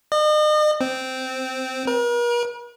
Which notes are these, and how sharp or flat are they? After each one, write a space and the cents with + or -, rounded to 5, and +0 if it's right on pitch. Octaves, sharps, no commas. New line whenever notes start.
D#5 -40
C4 -10
A#4 +45